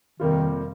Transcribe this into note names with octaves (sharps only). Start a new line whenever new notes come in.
F2 C3 D#3 G3 A#3 F4